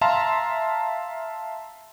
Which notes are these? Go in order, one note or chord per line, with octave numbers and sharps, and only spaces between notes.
E5 F5 A5 A#5 C6